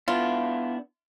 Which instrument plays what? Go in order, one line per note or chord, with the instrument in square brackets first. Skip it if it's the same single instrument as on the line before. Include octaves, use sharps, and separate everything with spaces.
[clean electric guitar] B3 D4 E4 [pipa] F4